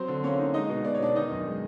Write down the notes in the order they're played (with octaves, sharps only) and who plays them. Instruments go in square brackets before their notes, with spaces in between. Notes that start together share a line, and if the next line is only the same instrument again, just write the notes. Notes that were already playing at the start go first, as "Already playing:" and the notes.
Already playing: [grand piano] F#3 C4 C5
D3
A#3 C#4 C#5
D#4
G#3 D#4 D#5
B2
B3 D5
C#5
B2 D4 D5
D#3 D#4 D#5
F#2
G#3